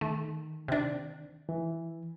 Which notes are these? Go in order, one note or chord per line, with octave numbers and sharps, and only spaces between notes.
D#3 A3
C3 D4
E3